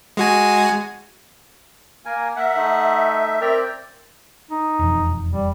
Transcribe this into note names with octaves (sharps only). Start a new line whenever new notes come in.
G#3 F#4 G#5
A#3 A#4 G#5
A#4 E5 F#5
A3 D#4
C4 A#4 D5 G5
D#4
E1 F2
G3